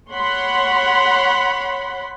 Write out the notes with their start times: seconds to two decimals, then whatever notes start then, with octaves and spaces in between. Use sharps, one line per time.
0.12 C#5 F#5 B5 C6